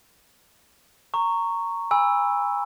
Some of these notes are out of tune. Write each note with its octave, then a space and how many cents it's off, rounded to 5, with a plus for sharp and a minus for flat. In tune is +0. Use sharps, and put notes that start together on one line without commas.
A#5 -15 C#6 +0
G#5 -30 B5 +5 E6 +0